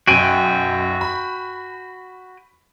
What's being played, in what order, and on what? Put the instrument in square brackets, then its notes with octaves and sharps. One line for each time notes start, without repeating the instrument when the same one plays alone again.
[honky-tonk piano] B1 F#2 [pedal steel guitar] F#4 G5 G#5
[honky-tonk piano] B5